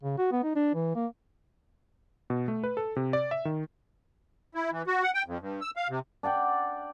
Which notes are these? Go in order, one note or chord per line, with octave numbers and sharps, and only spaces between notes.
C#3
F#4
B3
D#4
D4
E3
A#3
B2
A3
B4
A4
C3
D5
E5
D#3
E4
E3
F#4
F#5
G5
F2
G2
E6
F5
C3
D4 D5 F#5 G5